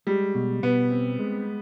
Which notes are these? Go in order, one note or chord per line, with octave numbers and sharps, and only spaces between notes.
G3 G#3
B2
B2 B3
C4
G#3